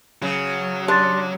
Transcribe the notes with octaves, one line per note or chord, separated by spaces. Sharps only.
C#3 F#3
D4 G4 C6 A6